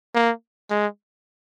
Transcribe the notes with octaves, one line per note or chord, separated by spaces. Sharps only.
A#3
G#3